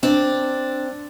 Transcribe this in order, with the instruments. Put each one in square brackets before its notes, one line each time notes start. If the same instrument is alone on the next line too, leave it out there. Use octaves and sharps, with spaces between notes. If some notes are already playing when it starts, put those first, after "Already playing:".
[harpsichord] C4 [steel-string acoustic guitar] D4